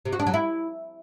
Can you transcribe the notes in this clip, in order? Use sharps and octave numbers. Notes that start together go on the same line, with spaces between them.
C3
F#4
D4
F#3
E4